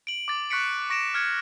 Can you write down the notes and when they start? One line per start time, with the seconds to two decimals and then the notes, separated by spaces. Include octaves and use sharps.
0.07 D7 F#7
0.28 D6 A6
0.50 C#6 F#6 A6 B6 C#7 D7
0.90 C#6 A#6 D7 E7
1.14 F6 G#6 C#7